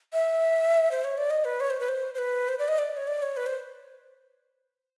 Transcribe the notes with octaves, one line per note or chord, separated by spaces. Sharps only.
E5
C5
C#5
D5
D#5
B4
C#5
C5
B4
C5
C5
B4
C5
D5
D#5
D5
C#5
D5
C#5
B4
C5